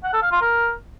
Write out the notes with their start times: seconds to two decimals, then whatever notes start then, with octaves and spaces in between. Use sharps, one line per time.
0.04 F#5
0.13 A4
0.22 F5
0.32 F4
0.41 A#4